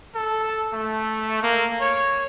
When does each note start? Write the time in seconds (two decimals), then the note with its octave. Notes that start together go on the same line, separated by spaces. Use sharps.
0.15 A4
0.73 A3
1.43 A#3
1.81 C#5